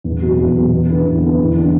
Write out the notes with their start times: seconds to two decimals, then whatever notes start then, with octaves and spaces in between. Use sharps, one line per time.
0.04 E2
0.22 B2 F#3
0.39 E2
0.55 B2 F#3
0.72 E2
0.89 D3 B3 E4 B4
1.06 E2
1.22 D3 B3 E4 B4
1.38 E2
1.56 E3 D4